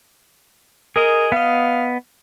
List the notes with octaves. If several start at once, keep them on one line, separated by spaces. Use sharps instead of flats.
G#4 A#4 D#5
B3 D#5 F5